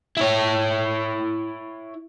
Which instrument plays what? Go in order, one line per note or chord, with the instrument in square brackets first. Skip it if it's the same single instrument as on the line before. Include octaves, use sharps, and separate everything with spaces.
[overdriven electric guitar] E4 C#5